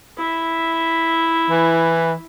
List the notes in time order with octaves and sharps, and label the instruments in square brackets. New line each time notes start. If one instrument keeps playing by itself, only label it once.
[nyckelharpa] E4 E5
[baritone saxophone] E3